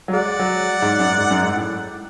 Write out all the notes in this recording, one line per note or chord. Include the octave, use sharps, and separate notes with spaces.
F#3
G#3 D5 F#5
F#3
G#2
F#2
G#2
F#2
G#2
A2